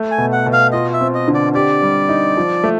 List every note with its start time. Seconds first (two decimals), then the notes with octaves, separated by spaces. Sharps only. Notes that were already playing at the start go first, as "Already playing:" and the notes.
Already playing: A3
0.11 G#5
0.18 B2
0.32 F#5
0.46 B2
0.53 F5
0.72 F4 D#5
0.93 E5
1.01 C4
1.15 D#5
1.28 D3
1.34 D5
1.54 G4 D5
1.82 G3
2.09 D#4
2.37 F3
2.64 A3